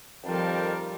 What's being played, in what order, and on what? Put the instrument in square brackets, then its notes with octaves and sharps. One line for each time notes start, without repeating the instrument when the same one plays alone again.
[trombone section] F2 D#3 [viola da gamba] F3 G3 [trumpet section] A#4 G5 A5